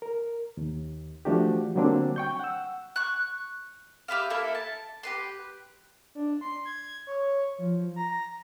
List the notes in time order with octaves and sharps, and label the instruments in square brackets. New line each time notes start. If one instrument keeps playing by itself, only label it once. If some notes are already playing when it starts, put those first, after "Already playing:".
[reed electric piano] A#4
D#2
E3 F3 A3 D4 F#4 G4
D3 F#3 G3 A#3 C4 D4
G5 C#6 G6
F#5 E6
[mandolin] C#6 F#6
G4 B4 E5 F5
A#3 E4 A4 A#4
A5
G4 B4 C6
[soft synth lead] D4
C6
G#6
C#5
F3
A#5